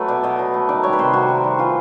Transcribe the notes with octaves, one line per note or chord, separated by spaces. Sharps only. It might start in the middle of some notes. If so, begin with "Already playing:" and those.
Already playing: F#3 A3 B4
B2 D5
B2 D#5
F#3
A3
D#3 D5
G3 C#5
B4
C3 C5
C3 F#4
D#3
G3
E3 F4